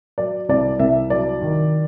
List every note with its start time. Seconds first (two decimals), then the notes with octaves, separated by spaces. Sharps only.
0.18 F#3 D5
0.49 C2 D5
0.79 C2 E5
1.10 F#3 D5
1.41 D#3